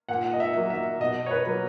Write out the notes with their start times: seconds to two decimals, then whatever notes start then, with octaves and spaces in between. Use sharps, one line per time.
0.09 A#2 F#5
0.33 D#5
0.40 E5
0.55 F#3 A#3
0.70 E5
1.00 B2 D#5
1.26 C#5
1.31 B4
1.46 F#3 A#3